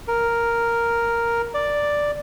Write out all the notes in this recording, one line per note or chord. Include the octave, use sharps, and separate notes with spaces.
A#4
D5